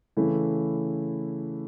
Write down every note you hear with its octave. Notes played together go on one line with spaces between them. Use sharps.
C#3 E3 A3 E4